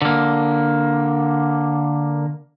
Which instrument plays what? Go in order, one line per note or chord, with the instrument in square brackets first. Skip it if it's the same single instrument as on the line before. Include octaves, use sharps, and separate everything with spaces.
[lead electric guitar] D3 A#3